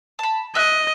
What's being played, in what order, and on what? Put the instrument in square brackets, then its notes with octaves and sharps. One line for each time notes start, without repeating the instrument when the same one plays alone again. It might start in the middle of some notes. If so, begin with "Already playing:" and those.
[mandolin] A5 B5
[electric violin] D#5 [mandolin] E5 F#6